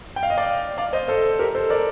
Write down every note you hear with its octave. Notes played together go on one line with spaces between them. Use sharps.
G5
F5
D#5
D5 F5
D5 F5
C5 D#5
A4 C5
G4 A#4
A4 C5
A#4 D5